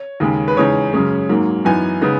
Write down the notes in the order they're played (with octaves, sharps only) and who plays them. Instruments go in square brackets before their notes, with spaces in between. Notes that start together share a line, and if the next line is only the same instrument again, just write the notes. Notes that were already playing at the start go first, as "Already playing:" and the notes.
Already playing: [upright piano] C#5
D#2 C#3 G#3
B4
E2 C#3 G#3 D#4 C#5
F#2 C#3 G#3 C#4
G#2 F#3 A#3
F#2 E3 B3 D#4 G#5
C#3 G#3 B3 D#4